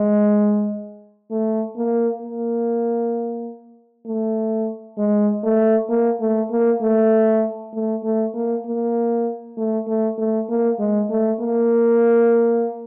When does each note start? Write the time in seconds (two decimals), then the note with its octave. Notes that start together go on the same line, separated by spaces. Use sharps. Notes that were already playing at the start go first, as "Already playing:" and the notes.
Already playing: G#3
1.31 A3
1.77 A#3
2.22 A#3
4.06 A3
4.98 G#3
5.44 A3
5.89 A#3
6.21 A3
6.51 A#3
6.81 A3
7.74 A3
8.04 A3
8.34 A#3
8.66 A#3
9.57 A3
9.87 A3
10.18 A3
10.49 A#3
10.79 G#3
11.10 A3
11.40 A#3